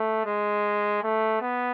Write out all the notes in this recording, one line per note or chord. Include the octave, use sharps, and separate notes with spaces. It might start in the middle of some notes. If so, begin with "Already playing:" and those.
Already playing: A3
G#3
A3
B3